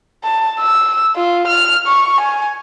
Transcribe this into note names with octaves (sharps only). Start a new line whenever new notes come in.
A5
E6
F4
F6
C#6
G#5